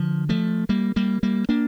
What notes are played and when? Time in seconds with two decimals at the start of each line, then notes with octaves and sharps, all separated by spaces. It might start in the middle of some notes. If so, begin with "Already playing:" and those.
Already playing: D3 F3
0.29 F3 A3
0.69 G3 A#3
0.96 G3 A#3
1.23 G3 A#3
1.49 A#3 D4